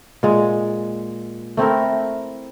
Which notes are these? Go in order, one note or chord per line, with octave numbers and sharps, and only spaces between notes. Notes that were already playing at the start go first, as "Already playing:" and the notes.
A#2 G#3
A3 C4 E4 A#4